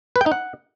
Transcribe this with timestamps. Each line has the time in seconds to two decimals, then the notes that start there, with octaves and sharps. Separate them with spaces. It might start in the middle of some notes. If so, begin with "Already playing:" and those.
0.16 B4
0.21 G5
0.26 D#4
0.32 F#5